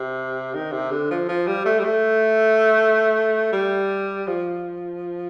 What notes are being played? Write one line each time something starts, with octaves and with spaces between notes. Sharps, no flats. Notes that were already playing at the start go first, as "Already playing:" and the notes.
Already playing: C3
D#3
C3
D3
F3
F3
G3
A3
G3
A3
G3
F3